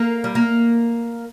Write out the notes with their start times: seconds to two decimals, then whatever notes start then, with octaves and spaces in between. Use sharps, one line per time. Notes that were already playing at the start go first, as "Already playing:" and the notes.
Already playing: A#3
0.24 G3
0.35 A#3